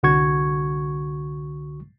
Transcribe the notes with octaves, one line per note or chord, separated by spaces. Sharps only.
C2 D3 F#4 C#6 G#6